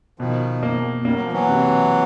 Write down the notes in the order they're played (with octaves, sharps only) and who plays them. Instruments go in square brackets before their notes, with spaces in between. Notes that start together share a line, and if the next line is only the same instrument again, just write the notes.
[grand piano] B2 [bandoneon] D#3 F3
[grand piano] A#3
[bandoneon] G3 [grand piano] A#3
[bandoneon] F#3
F3
E3 F#3
[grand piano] C3